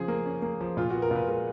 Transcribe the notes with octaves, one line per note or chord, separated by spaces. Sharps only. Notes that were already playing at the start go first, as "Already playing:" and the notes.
Already playing: C#3 F3 G#4
A#3
C#4
A#3
F3
A#2 F4
F#4
B3
A#4
A#2 B4
G#3 A#4